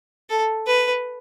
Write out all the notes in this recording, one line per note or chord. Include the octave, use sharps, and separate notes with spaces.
A4
B4